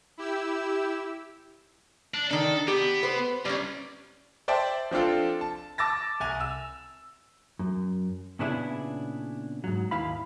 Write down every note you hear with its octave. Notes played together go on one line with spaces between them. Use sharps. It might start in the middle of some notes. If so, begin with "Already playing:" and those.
E4 G4 E6
D4
D#3 D4 A4
B3 G4
B4 C5
C2 G3 C#4
C5 D5 E5 G5 A5
F3 C4 D4 F4 A4
A5
A5 D6 E6 A6 A#6
C2 G#5 F7
E6
F#2
A#2 C#3 B3 D4 E4 G#4
G#2 F#3
D#2 E4 F5 B5